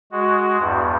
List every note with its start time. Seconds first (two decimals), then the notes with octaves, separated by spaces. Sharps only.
0.12 G#3 F#4
0.59 E2 G2